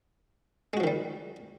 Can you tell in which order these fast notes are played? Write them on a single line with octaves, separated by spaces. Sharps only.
G#3 F#4 F3 D#3 G3